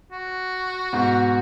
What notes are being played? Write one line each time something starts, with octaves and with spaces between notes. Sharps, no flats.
F#4
G#2 B2